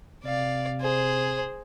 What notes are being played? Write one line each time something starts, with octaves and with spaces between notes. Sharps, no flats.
C3 D5 F5
G#4 C5